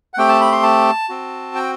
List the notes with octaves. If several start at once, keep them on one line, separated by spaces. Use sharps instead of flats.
F#5
A3 C4 G4 G5
A5
B5
C6
A5
C4 F#4
G5